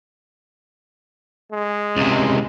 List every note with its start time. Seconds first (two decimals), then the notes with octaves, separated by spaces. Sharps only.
1.52 G#3
1.96 C#2 C3